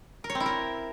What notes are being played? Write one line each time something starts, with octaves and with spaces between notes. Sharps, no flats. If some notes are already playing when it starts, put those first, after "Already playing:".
A#4
C#5
C4
E4
A#4